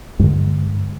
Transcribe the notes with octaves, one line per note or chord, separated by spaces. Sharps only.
G2 D3 G#3